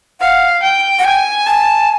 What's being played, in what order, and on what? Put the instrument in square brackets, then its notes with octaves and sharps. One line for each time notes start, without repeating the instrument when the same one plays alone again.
[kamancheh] F5 [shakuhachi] F#5
[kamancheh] G5
[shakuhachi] F#5
[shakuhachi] G5 [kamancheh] G#5
[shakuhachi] G#5 [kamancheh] A5